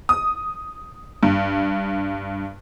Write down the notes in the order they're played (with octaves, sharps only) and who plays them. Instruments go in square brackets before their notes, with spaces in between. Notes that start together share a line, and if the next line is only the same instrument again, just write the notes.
[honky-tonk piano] D#6
G2